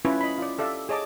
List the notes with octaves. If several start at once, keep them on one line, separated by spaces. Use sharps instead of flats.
C#4 E4 F4 B4 C#5
D#5 B5
F4 D5
G4 A4 D5 E5 F5
G#4 C#5 D#5 A5 D6